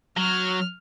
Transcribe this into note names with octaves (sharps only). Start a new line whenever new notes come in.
F#3 F6